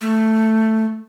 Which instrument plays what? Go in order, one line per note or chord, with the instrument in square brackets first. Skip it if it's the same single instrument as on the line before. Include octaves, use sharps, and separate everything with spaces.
[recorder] A3